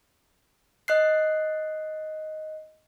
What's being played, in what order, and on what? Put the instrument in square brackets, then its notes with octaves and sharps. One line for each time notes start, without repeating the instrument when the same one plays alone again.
[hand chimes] D#5 F#6 C7